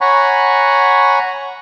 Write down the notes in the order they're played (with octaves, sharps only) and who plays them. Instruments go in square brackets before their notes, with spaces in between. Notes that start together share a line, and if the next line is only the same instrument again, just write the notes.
[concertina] C#5 F#5 G#5 A#5 B5 C#6